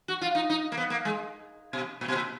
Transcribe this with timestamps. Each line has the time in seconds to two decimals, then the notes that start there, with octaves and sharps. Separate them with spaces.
0.08 F#4
0.21 F4
0.35 D#4
0.50 D#4
0.72 A#3
0.77 B3
0.90 A#3
1.05 G#3
1.73 B2
2.01 A#2
2.08 B2
2.16 A#2